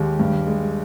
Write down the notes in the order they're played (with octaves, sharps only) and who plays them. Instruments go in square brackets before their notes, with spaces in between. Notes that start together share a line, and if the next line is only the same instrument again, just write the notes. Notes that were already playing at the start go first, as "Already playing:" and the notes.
Already playing: [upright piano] D#2 G#3 G4
G2
G#3